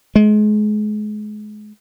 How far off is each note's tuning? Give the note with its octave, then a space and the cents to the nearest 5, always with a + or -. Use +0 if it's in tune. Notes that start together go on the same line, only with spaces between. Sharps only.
G#3 +30